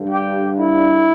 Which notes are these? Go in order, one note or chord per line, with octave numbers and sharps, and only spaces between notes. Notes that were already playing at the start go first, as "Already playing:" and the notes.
Already playing: G2 D3
G4
E4